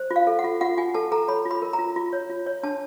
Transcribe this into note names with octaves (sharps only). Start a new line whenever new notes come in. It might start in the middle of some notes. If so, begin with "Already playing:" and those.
Already playing: C5
F4
F5
A4
F#5
F4
F4 F#5
F4 G#5
A4 A5
A4 A#5
C#5 B5
F4
B5
A#4
A#5
F4
F4
C#5
F4
C#5
D4 A5